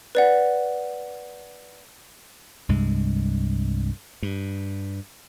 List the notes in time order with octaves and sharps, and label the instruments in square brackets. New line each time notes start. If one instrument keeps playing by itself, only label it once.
[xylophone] B4 D5 F#5
[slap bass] C2 G2 G#3
G2